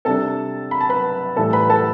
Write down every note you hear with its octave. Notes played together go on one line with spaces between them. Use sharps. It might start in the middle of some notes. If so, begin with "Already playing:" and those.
C3 G3 D4 A4 A5
B5
A5
B4 B5
A2 E3 G3 A4 A5
B4 B5
A4 A5